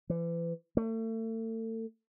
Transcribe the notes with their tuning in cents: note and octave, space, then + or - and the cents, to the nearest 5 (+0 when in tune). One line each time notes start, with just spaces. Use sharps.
E3 +35
A3 +35